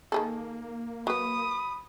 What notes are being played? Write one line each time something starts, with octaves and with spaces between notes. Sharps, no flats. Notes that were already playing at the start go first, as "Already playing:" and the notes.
D#3 A#3 G#4 A4
F#3 B4 B5 D#6